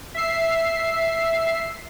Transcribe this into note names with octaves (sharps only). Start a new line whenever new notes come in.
E5 C7